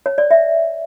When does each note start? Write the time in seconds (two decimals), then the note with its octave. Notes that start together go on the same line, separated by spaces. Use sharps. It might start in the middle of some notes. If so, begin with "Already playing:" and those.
0.06 C#5
0.18 D5
0.31 E5